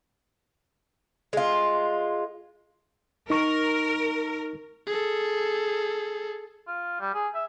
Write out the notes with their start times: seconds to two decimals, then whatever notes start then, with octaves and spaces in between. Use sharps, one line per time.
1.33 G#3 F4
3.30 D#4 A#4 C#6
4.86 G#4 A4
6.67 F4
7.00 G3
7.14 G#4
7.35 E5